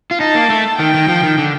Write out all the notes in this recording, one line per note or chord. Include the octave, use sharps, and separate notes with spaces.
F4
D#4 A5
A#3
A3
D#3 G5
D#3
F3
D#3
D3